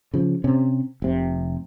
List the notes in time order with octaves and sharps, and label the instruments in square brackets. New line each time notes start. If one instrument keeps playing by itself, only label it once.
[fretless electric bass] C#3 F3
C3 C#4
F1 C3